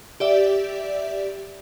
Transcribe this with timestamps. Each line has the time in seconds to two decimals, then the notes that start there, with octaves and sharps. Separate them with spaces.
0.20 G4 D5 E5